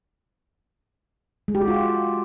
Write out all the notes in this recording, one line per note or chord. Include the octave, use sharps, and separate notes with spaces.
G#3
G4
F#4
F4